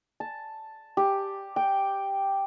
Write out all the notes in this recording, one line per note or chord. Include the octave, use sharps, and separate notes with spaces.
A5
G4
G5